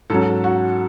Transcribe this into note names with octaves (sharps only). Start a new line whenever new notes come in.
G#2 F#3 C#4 A4
F#4